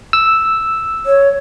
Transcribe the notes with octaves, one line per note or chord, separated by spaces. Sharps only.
E6
C#5